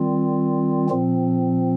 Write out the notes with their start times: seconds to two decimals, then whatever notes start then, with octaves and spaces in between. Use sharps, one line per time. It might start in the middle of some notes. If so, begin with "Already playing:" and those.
Already playing: D#3 G3 C4 F4
0.90 A#2 F3 C4